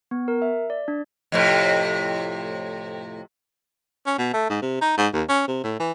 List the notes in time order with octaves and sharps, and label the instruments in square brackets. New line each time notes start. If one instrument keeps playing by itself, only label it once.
[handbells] B3
A#4
E5
D5
D4
[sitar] F2 A2 C3
[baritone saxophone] C#4
B2
A3
G#2
C3
D#4
G#2
D#2
C#4
C3
A2
E3